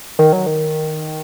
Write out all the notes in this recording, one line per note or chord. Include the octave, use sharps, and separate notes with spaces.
D#3
F#3
D#3